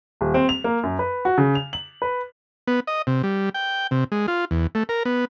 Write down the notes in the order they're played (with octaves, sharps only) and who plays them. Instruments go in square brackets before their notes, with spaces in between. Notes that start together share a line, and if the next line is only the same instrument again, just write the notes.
[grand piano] D#1
C4
F7
A#3
F#2
B4
F#4
C#3
F7
F#7
B4
[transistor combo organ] B3
D#5
C3
G3
G5
C3
G#3
F4
E2
A3
A#4
B3